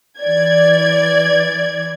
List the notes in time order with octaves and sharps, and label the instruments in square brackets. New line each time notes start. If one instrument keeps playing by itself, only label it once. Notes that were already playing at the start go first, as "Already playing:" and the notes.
[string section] E3 D5 G#6